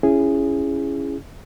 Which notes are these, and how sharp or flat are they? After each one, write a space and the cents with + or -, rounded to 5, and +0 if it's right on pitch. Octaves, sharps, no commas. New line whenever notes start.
C#4 +0 E4 +20 G#4 -5